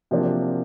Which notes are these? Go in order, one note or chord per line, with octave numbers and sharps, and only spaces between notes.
C3 F3 A#3 D4 F#4